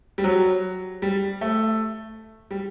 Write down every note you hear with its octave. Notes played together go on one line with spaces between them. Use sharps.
G3
F#3
G3
A3
G3